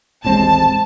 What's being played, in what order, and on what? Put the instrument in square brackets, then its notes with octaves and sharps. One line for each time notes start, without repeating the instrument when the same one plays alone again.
[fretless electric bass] D#1 A1 C4 [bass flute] G#3 [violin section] A5